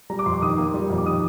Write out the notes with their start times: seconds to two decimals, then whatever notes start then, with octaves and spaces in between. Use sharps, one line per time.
0.10 G3 A#5
0.19 D6
0.26 F2 C6
0.34 D6
0.42 D#3 D#6
0.58 A#3
0.74 G3
0.90 F2
0.98 D6
1.06 D#3 D#6